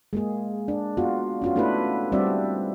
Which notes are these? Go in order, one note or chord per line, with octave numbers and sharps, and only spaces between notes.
G#3 A#3 G#4
D4
B3 F4 F#4
C#4 F4 F#4
A3 B3 D4 E4 F#4 B4
G3 C4 D4 F#4 D5 E5